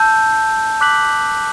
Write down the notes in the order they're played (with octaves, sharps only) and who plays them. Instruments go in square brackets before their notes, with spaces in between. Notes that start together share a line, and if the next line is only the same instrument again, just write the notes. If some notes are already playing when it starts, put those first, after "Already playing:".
Already playing: [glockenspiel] A5 E6 G6
D6 F#6 B6 F#7